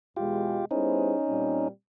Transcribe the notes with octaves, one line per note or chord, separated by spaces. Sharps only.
E2 B2 G#3 F4 G4
G3 B3 C#4 D#4 E4 G#4 C5
A#2 G3 C4